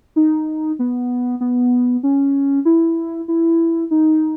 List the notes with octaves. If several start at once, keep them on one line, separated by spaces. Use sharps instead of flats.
D#4
B3
B3
C#4
E4
E4
D#4